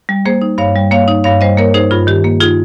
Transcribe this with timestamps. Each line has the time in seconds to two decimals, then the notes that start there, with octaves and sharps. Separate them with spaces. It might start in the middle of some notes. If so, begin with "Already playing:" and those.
0.09 G3
0.25 A#3 G#4 C5
0.42 D#4
0.58 G2 C#5 F5
0.76 G3
0.91 A#3 C#5 F5
1.08 D#4
1.24 G2 C#5 F5
1.41 G3 C5 D#5
1.57 A#3 A#4 C#5
1.74 D#4 G#4 C5
1.91 G2 F4 G#4
2.07 D#3 G4
2.24 A#3
2.40 D#4 F4 G#4